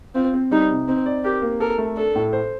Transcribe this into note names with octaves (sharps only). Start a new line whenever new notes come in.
C4 F4
C4
G3 D#4
C3
C4 D#4
D5
G4 A#4
A#3
A4 A#4
A3
D4 A4
A2
C5